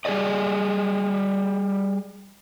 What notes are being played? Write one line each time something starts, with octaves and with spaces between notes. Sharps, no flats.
G3 G#4 A4 D5 D#5